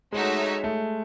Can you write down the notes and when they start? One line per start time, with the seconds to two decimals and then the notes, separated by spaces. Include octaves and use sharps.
0.12 G#3 A3 D#4 F#4 C#5 E5
0.64 A3